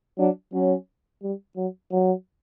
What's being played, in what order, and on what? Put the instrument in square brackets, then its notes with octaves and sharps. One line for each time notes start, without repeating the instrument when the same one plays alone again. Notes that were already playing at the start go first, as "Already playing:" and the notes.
[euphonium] F#3 [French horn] D4
[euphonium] F#3 [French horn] C#4
[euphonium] G3
F#3
F#3